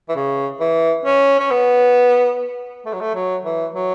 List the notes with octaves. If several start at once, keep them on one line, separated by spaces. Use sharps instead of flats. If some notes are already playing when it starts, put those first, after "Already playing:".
E3
C#3
E3
C#4
C#4
B3
A3
F#3
A3
F#3
E3
F#3